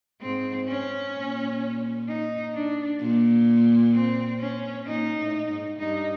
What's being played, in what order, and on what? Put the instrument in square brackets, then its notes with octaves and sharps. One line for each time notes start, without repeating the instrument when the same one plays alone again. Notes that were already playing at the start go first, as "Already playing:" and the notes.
[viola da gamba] G#2 [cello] C4
[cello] C#4
[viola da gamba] A#2
[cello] D#4
D4
[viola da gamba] A#2
[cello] C4
C#4
[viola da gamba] A#2 [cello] D#4
[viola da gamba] A2
G#2
[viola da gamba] G2 [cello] D#4